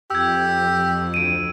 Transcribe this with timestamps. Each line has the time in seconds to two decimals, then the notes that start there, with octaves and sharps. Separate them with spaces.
0.10 F2 G4 E6 G#6
1.14 D2 D7 D#7